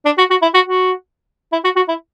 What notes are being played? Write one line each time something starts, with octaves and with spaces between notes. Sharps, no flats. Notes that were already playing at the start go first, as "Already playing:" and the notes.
D4
F#4
F#4
E4
F#4
F#4
E4
F#4
F#4
E4